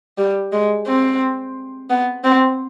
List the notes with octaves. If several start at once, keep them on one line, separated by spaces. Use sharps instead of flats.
G3
G#3
C4
B3
C4